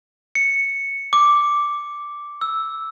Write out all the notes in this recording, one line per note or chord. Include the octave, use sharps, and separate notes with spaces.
C#7
D6
E6